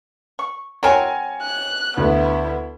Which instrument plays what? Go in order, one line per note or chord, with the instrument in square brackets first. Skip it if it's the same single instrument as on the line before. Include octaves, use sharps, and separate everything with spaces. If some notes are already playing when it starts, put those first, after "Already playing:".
[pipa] C#6
[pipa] F#3 C4 A#4 [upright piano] C#5 G#5
[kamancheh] F#6
[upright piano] D2 [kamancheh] B3 E4